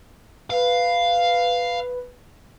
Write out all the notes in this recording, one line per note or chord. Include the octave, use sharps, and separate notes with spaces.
B4 F5